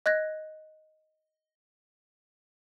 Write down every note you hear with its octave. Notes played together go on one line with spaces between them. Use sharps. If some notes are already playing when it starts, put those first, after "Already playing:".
D#5 F#6 G#6 A#6